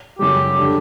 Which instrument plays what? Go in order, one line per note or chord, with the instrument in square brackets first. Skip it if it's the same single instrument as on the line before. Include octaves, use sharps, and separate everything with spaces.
[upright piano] F#2 C#3 G3 [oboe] G4
[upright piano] D3 G3 D4